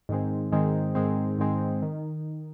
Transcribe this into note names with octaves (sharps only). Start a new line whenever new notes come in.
G#2 D#3 G#3 C4
G#2 D#3 G#3 C4
G#2 D#3 G#3 C4
G#2 D#3 G#3 C4
D#3